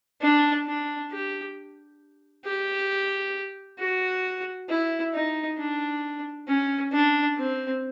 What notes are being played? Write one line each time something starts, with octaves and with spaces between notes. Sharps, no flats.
D4
D4
G4
G4
F#4
E4
D#4
D4
C#4
D4
C4